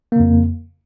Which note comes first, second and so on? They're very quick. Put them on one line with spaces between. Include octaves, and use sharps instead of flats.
A#3 C#3 F2